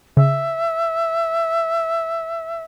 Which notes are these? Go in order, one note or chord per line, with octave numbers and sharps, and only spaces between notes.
C#3 E5